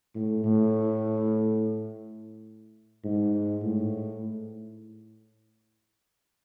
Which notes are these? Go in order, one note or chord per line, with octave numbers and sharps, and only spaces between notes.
A2
A2
G#2
A2